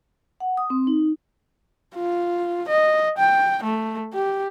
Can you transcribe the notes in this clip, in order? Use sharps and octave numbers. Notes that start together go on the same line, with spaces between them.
F#5
D#6
C4
D#4
F4
D#5
G5
A3
G4